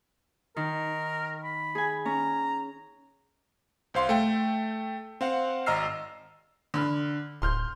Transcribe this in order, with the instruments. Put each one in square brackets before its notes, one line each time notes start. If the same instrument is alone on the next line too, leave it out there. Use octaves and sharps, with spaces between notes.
[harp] D#3 [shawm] A#4
[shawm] B5
[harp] G#4 G#5
[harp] C#4 [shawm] A#5
[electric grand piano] C2 C5 F5 C6
A3 G5
C4 F5 F#5
G#1 D#5 A#5 E6 F6 C7
[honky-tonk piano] D3 B5 F6
[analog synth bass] D1 [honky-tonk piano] C6 F6 G6